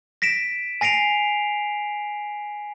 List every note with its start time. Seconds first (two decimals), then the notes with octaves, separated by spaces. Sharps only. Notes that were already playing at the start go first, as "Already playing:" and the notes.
0.22 A#6 B6 D7 E7
0.81 G#5 A#6 C7 D7 F7